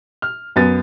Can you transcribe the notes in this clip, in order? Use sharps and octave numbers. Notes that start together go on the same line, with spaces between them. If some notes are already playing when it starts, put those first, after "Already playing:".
F6
F#2 B3 A6